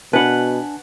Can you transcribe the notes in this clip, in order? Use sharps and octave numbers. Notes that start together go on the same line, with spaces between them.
B2 D4 B4 F#5 G#5 A5